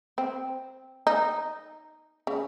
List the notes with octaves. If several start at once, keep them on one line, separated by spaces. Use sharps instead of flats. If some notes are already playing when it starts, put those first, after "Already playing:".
C4
D#4
C#3